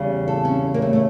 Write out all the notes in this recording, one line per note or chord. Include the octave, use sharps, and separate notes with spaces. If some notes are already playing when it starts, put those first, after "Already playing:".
Already playing: E2 C#3 G3
A4
C#4
A#3
A3
A3